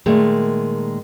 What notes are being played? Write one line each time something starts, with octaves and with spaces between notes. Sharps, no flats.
A#2 D#3 G#3 A3